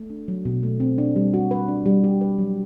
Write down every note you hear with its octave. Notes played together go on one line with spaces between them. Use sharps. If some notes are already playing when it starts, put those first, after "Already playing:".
Already playing: A3
D4
F#3
B2
A3
C4
D4
G3
F#4
B4
D4
G3
G4
B4
F#3